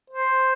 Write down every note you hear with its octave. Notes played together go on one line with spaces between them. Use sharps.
C5